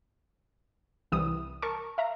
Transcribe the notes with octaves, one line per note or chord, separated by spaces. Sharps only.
C2 E3 G3 D#6
A#4 A5 C#6
E5 F5 A#5